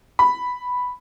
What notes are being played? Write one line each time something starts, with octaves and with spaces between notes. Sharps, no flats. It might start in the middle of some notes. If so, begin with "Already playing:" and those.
B5